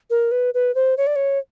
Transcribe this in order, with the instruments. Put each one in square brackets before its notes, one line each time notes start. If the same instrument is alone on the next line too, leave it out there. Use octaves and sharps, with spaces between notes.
[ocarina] A#4
B4
B4
C5
C#5
D5
C#5